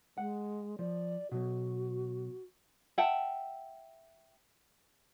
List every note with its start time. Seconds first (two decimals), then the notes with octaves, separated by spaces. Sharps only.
0.18 G#3 F#5
0.79 F3 D5
1.32 B2 F#3 F#4
2.98 E5 F#5 G5 A5